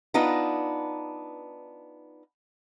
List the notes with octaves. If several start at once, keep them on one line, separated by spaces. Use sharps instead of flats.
B3 D4 D#4 F4 B4